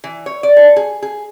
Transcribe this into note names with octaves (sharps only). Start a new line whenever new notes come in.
E3
C#5
D5
A4
G#4
G#4